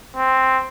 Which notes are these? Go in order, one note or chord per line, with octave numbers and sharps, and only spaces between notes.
C4